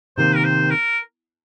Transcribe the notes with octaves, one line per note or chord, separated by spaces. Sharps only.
C3 D#3 A#3 C5
A#4
C5
A#4